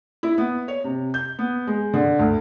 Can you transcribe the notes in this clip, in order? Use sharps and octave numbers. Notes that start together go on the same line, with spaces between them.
E4
B3
C#5
C3
G6
B3
G#3
D3
D2